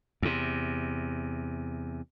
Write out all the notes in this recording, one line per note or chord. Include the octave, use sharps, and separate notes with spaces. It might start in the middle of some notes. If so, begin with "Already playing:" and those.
E2 C3